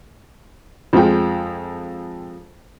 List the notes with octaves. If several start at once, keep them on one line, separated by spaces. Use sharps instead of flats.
F2 F3 G#3 G5